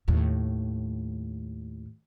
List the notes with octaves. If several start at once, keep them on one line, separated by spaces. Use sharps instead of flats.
D#2 A2